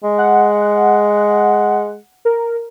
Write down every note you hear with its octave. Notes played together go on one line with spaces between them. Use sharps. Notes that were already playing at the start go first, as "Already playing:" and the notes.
G#3
F#5
A#4